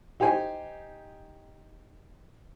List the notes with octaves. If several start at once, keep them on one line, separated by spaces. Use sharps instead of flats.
D#4 G4 C5 G#5